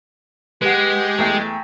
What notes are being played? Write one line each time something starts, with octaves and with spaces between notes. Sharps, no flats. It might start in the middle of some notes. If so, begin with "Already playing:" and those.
G#3 G4 B4 F#5
E2 A3 G5